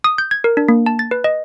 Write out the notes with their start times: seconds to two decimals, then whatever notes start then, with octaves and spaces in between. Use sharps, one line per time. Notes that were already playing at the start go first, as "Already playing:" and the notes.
0.04 D#6
0.18 G6
0.31 G#6
0.44 A#4
0.57 D4
0.68 A#3
0.86 A5
0.99 A6
1.11 B4
1.24 D#5